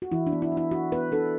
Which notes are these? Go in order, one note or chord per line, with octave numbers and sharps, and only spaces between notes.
F#4
E3 E4
D4
B3
E4
B3
E4
D4 F#4
B3 B4
D4 A4